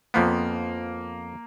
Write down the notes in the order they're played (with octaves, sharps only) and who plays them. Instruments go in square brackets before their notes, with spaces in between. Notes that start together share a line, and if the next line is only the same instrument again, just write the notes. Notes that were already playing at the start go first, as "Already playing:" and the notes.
[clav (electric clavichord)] F2 F3 B3 [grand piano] A#3